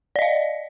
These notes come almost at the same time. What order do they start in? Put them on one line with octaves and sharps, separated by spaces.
D5 D#5 F5